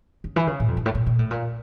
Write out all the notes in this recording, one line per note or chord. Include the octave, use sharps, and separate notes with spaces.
C#3
E3
C#3
A2
F2
G2
A2
A#2
A#2
A2
A#2